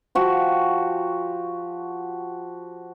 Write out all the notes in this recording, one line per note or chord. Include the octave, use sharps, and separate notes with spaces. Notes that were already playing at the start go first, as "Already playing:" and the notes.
F3 F#4 G4